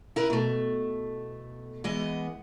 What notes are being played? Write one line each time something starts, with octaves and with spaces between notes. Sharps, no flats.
E4 A#4 B4
B2 A3
E3 G#3 B3 D#5